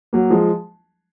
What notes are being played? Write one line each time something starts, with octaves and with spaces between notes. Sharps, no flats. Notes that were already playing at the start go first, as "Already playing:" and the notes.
F#3 A#3
F3 G#3